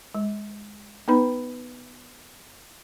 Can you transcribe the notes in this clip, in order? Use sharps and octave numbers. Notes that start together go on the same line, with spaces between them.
G#3
B3 D#4 B4 B5